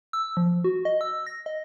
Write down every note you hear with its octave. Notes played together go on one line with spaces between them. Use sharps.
E6
F3
F#4
D#5
E6
A#6
D#5